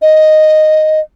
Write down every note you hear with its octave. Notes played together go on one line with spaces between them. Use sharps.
D#5